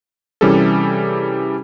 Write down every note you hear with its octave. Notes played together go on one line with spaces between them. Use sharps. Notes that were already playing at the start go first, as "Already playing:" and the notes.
C3 E3 G3 C#4 G#4 A4